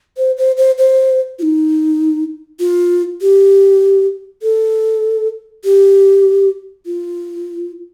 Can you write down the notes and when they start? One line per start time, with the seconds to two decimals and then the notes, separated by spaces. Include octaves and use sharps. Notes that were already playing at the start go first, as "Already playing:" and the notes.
0.18 C5
0.38 C5
0.57 C5
0.78 C5
1.39 F4
1.42 D#4
2.60 F4
3.21 G4
4.42 A4
5.64 G4
6.86 F4